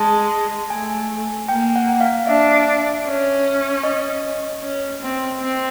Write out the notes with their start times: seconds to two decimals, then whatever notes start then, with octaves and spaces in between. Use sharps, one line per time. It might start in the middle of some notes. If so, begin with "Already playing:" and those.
Already playing: G#3 A5
0.70 A3 G#5
1.49 A#3 G5
1.76 F#5
2.01 F5
2.27 D4 E5
3.06 C#4
3.84 D#5
4.62 C#4
5.01 C4
5.40 C4